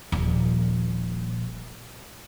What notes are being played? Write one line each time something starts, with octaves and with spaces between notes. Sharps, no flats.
D#1 A#1